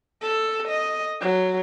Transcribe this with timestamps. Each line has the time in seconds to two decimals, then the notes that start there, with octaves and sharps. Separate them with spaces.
0.22 A4
0.68 D#5
1.21 F#3